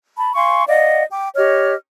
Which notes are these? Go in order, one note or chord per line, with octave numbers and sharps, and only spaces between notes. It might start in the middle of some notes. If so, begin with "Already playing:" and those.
A5 B5
F5 G#5 C6 C#6
D5 D#5 F5 F#5
G5 D6
G4 C#5 D#5 F6